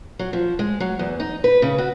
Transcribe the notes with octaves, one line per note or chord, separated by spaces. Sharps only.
F#3
F3
G#3
F#3
E2
D#4
B4
C#3
F#4